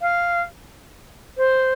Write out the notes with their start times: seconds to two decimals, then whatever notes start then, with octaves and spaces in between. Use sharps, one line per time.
0.01 F5
1.37 C5